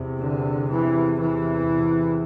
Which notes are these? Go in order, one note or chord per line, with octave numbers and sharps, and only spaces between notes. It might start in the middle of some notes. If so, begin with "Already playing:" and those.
Already playing: E2 C3
D3
E3
E3
E2 C3